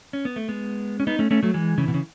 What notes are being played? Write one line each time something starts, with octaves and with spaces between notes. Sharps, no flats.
C#4
B3
A3
G#3 B3
C#4
B3 D#4
A3 C#4
A3 C#4
F#3 A3
E3 G#3
C#3 E3
B2
C#3